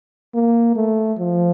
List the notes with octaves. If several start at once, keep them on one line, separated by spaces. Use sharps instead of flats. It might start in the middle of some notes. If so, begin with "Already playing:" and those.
A#3
A3
F3